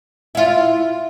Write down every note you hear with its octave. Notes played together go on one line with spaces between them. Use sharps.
E4 F4